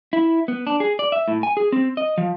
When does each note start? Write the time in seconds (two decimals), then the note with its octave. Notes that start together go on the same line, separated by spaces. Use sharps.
0.13 E4
0.48 B3
0.67 D4
0.80 G#4
0.99 D5
1.12 E5
1.28 A2
1.43 G#5
1.57 G#4
1.72 C4
1.97 D#5
2.18 F3